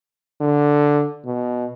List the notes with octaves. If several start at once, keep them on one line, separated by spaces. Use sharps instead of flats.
D3
B2